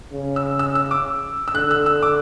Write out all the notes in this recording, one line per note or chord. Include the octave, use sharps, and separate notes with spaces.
C#3
E6
E6
E6
D6
E6
D3 F#6
E6
E6
D6